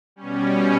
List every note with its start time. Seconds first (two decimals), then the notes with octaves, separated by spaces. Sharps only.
0.16 G3 C#4
0.21 B2
0.45 C#4